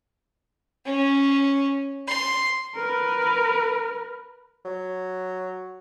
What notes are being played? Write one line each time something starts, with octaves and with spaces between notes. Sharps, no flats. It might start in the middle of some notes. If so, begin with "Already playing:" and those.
C#4
C6
A#4 B4
F#3